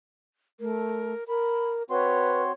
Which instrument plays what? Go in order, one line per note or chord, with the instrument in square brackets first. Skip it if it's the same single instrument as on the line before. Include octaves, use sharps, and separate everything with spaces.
[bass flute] A3 [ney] A#4
[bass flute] A#4 [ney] B5
[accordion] C4 F#4 C6 [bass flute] B4 [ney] C#5